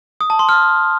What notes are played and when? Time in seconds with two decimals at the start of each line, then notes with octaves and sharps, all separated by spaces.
0.21 D#6
0.30 A5
0.39 C6
0.49 F6